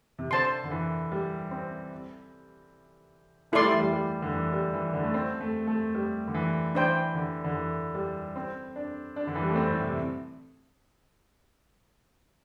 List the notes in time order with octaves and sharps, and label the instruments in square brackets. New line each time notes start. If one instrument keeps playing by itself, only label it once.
[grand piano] C3
[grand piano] D3 [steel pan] C5 A5 C6
[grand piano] D3
E3
G3
C4
[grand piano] A3 [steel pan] E4 A4 D5 C6
[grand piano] G3
E3
G3
G3
D3
E3
G3
E3
D3
A3
C4
A3
A3
G3
D3
E3
[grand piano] E3 [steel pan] D4 C5 G5
[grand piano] D3
D3
E3
G3
C4
D4
D4
D3
E3
G3
A3
C4
A2
C3